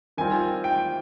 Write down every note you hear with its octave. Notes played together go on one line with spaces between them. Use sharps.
D#3 G3 C4 F4 G#5
G5